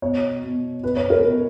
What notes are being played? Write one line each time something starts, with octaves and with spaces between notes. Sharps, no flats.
B2 C#5
B2
B2 B4
C#5
A#4
B2